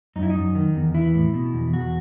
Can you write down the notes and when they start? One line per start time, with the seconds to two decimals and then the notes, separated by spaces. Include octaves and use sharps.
0.16 F#2 D#4
0.23 E4
0.30 D#4
0.35 F#2
0.55 D#3
0.75 E2
0.94 E3 E4
1.14 A2
1.34 B2
1.54 E2
1.73 E2 F#4